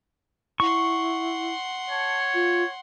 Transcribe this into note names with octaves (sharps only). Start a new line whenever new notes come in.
E4 F#5 C6 C#6
C#5 A5
F4